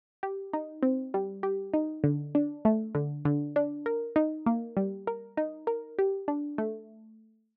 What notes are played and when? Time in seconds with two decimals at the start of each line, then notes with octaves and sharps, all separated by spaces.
0.23 G4
0.53 D#4
0.83 C4
1.14 G3
1.43 G4
1.74 D#4
2.04 D3
2.35 D4
2.65 A3
2.95 D3
3.25 D3
3.56 D4
3.86 A#4
4.16 D#4
4.46 A#3
4.77 G3
5.07 A#4
5.37 D#4
5.67 A#4
5.99 G4
6.28 D4
6.58 A3